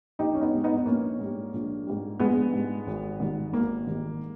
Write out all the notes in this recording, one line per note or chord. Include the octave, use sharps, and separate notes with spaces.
A#1 D#4 G4
C#4
B3 D#4
G#2 G3
B3 D#4
D#4
A#1 A#3 C#4
G#2 G3
A#1
G#2 G3
A#1 G#3 B3
G#2 G3
G#1
G#2 D#3 G3
G#1 A#3
G#2 D#3 G3